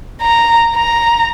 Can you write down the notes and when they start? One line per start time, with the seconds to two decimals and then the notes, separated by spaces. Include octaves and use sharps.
0.21 A#5
0.76 A#5